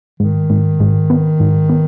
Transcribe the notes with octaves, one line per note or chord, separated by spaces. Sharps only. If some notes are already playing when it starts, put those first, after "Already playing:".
G#2 D#3
G#2
G#2
B3
G#2
B3